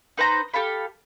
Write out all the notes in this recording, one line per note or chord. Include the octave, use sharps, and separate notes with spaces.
D#4 B4 C5 A#5
G4 A4 F5 B5